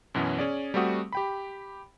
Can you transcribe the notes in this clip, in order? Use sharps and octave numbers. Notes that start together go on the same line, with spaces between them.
F#2 B2 E3 B3 C#4
C#4 G#4 D5
G3 A3 C4 F#4 D#6
G4 G5 B5